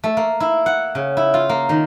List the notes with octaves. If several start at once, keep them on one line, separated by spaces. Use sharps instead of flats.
A3
A#3
E4
F#5
C#3
E4
F4
A#3
D#3